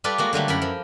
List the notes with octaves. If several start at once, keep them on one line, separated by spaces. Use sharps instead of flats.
G3 F4 A4 B4 D5
G#3 A#3 F#4
D3 F#3 G3 A3
F#2 E4 A#4 B5
F3